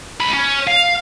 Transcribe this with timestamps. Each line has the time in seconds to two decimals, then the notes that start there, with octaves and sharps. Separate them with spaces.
0.20 C#2 B5
0.34 C#4
0.67 F5